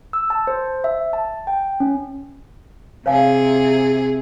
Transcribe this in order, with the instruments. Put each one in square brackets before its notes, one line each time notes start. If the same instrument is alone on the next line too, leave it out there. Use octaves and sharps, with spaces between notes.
[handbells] E6
A5
C5
E5
A5
G5
C#4
[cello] C3 G#4 [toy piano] C#5 F5 G#5